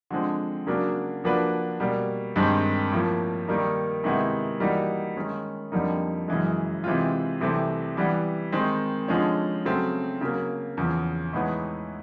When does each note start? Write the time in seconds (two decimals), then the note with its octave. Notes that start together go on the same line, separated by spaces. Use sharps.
0.11 D3 F3 G#3 C4
0.67 C#3 F#3 A#3 D4 F#4
1.24 F3 A#3 D4 F#4 B4
1.80 B2 G3 A#3
2.36 G2 D#3 G#3 C4
2.92 A2 F3 A#3
3.48 D#3 G3 A#3 D#4
4.04 C3 D#3 G#3 B3 E4
4.60 E3 G3 A#3 D#4 F#4
5.17 D#3 G#3 C#4
5.72 F2 D3 G3 A#3 D#4
6.28 F#2 C#3 E3 G#3
6.84 C3 E3 G#3 C4 F4
7.41 C2 C3 E3 A3 C4
7.97 E3 G3 B3
8.52 D#3 G#3 C4
9.08 D3 F3 G#3 C#4
9.65 C#3 F#3 A3 C4
10.21 C#3 F#3 A#3
10.77 E2 C#3 F3
11.33 A2 E3 G#3 B3 D#4